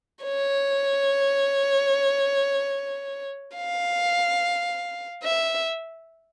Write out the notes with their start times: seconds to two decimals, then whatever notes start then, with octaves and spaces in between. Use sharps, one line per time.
0.24 C#5
3.56 F5
5.23 E5